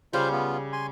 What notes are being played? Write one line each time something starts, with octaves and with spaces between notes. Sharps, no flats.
C#3 G3 F4 C5
B3 F4
G#5 C6